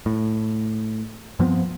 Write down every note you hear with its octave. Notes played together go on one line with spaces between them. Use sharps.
A2
G2 F3 B3 C4